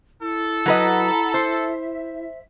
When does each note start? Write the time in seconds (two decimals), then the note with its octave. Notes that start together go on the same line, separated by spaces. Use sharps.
0.21 E4 A4
0.66 F#3 B4 D#5 F#5 A#5 B5
1.34 C5 E5